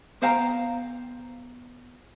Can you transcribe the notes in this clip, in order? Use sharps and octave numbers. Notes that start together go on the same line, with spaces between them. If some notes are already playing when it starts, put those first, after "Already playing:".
B3 C5 F5 G5 A#5